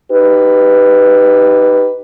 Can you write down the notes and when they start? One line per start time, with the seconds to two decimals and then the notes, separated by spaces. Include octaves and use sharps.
0.12 D#4 G4 B4